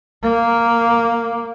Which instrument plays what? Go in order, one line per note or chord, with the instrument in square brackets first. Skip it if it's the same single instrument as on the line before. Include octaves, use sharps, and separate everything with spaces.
[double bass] A#3